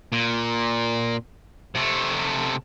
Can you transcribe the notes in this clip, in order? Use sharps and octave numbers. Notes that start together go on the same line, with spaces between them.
A#2
C3 A3